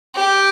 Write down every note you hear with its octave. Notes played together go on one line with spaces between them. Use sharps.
G4